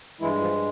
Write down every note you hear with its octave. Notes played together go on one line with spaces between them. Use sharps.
G2 E3 G#3 E4
F3 F4